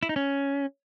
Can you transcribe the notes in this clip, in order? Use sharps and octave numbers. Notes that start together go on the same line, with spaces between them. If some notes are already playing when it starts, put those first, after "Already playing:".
E4
D#4
C#4